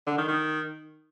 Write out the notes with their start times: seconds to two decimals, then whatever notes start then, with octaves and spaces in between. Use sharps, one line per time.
0.07 D3
0.17 D#3
0.28 D#3